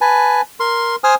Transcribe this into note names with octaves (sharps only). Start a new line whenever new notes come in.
B4 G#5 A5
A#4 C6
C5 G#5 D#6 F6